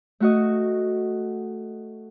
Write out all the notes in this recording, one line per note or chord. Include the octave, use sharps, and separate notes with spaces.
A3 F#4 D#5